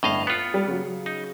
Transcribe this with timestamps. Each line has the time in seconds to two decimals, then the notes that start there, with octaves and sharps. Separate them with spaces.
0.03 G1 A2 D#5 F5
0.27 B3 F4 C#7
0.54 G3
0.67 C#3 F#3
1.06 D#4